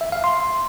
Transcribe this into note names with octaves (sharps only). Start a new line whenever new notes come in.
E5
F5
C6